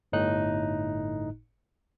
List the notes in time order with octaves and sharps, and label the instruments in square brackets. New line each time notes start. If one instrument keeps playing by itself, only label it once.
[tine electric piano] G1 A2 D#4 F#6